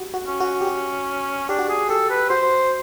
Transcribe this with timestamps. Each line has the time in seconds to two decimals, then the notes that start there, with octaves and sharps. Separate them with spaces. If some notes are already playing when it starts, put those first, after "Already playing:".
Already playing: F#4 G4
0.14 F#4
0.27 C#4
0.40 F#4
0.61 G4
0.67 F#4
1.49 D4 G4
1.59 F#4
1.68 G4 G#4
1.89 G4 A4
2.10 B4
2.29 F#4 C5